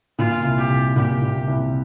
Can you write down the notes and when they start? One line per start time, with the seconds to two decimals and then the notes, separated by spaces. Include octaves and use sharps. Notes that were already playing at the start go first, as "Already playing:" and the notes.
0.19 A#2 F4
0.45 C2
0.58 G4
0.71 C2
0.96 A#2 G4
1.22 A#2
1.47 C2